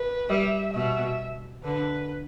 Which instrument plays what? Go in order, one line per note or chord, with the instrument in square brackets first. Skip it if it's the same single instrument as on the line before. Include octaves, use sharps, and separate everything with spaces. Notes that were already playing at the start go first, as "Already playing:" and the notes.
Already playing: [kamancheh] B4
[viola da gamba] G3 [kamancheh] E5
[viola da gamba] B2 [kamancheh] E5
[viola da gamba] D3 [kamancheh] B4